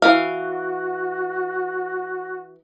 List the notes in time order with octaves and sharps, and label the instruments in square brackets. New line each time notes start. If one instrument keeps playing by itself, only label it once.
[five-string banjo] E3 F5 [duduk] F#4